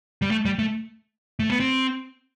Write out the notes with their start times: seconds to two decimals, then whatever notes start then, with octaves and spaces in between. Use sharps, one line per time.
0.22 G3
0.31 A3
0.45 G3
0.59 A3
1.40 A3
1.50 B3
1.60 C4